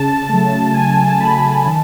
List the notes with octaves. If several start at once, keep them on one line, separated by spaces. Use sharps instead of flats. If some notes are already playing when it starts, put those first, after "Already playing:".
Already playing: C#3 A5
A5
F#3 A3
A5
C#3 G#5
G#5
A5
A5
F#3 A3 B5
A5
B5
D#3 A5